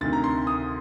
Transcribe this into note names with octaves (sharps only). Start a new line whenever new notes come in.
D2 C3 D#3 A6
A#5
C6
D#6